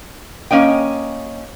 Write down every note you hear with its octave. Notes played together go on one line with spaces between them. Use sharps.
A#3 C#4 D#5 G5